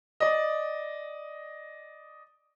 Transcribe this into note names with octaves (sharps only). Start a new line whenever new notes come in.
D5 D#5